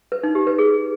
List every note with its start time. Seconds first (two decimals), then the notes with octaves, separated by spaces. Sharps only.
0.12 B4
0.23 D#4
0.35 G4
0.47 B4
0.58 G#4